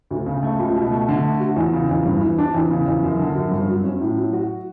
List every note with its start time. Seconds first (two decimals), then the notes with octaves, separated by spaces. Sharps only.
0.11 D2
0.26 C#3
0.43 A3
0.59 C#2
0.76 B2
0.91 A3
1.09 D3
1.24 A3
1.40 F#4
1.56 E2
1.73 C#3
1.89 E2
2.05 G2
2.21 E3
2.38 D4
2.54 E2
2.70 C#3
2.86 E2
3.03 F#2
3.19 D3
3.35 F#2
3.52 G2
3.69 F#3
3.84 C#4
4.00 A2
4.17 F#3
4.33 F#4